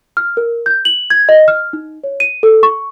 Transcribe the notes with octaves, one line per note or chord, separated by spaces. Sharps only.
F6
A#4
G6
F#7
G#6
D#5
F6
D#4
C#5
D#7
A4
C#6